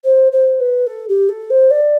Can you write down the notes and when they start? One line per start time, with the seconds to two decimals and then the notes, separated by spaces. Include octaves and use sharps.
0.05 C5
0.32 C5
0.60 B4
0.87 A4
1.09 G4
1.29 A4
1.50 C5
1.71 D5